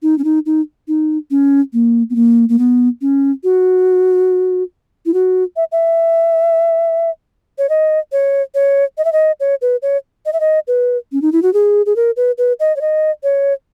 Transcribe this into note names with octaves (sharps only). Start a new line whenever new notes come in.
D#4
C#4
D#4
D#4
D#4
C#4
A#3
B3
A#3
A#3
B3
C#4
F#4
E4
F#4
E5
E5
C#5
D#5
C#5
C#5
D#5
E5
D#5
C#5
B4
C#5
D#5
E5
D#5
B4
C#4
D#4
E4
F#4
G#4
G#4
A#4
B4
B4
D#5
C#5
D#5
C#5